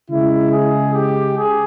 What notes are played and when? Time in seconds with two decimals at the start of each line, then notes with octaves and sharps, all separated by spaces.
0.10 C#3 G#3 E4
0.52 G#4
0.94 G4
1.36 G#4